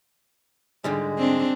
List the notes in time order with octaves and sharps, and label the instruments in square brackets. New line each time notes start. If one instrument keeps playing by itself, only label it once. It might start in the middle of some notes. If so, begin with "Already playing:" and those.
[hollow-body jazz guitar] G#2 D3 G3 [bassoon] G#3
[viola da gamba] C4 D4